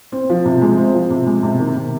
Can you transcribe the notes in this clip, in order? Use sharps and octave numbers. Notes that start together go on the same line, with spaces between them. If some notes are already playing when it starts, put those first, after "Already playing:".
C4
F3
C3
G#3
C4
F3
C3
G#3
C3
D#3
C3